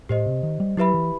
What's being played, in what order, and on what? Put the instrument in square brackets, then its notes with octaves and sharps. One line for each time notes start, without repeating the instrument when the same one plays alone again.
[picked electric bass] A2 [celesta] G4 C5 D#5
[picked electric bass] C3
D#3
G3
[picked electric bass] F#3 [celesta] E4 G4 B4 E5 B5
[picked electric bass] E3